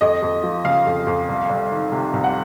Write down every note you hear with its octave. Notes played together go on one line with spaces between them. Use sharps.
F2 D#5
F2
F3
C#3 F5
F2
F2
C2
C2
D#3
C3
C2
F#5